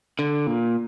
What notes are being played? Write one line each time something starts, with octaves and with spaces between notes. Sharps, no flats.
D3
A#2